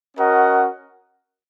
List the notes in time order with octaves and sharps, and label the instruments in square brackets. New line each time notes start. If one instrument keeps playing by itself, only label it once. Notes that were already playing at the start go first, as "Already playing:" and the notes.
[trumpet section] C#4 F#4 A#4 D#5 F#5